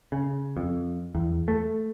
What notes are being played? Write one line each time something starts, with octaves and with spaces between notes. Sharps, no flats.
C#3
F2
E2
A3